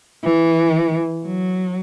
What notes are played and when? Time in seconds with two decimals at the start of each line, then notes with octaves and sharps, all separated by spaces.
0.24 E3
1.26 F#3